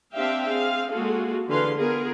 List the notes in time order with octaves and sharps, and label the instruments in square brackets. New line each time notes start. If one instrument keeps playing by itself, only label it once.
[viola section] C4 D4 G4 E5 F5 G5
C4 G#4 F5
G#3 A#3 F4 F#4 G#4 A4
D3 E3 G#4 B4 F5 C6
B3 F4 G#4 A#4